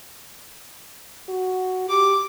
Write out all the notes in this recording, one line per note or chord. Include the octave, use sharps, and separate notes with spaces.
F#4
G4 D6